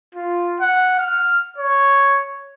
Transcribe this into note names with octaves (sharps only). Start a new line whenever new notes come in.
F4
F#5
F6
C#5